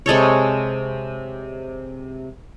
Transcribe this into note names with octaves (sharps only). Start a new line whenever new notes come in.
C3 G#3 A4 C#5